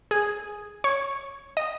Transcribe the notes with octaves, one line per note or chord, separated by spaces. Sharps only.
G#4
C#5
D#5